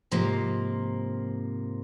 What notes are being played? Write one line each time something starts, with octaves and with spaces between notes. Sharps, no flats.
G#2 C3 F3 A#3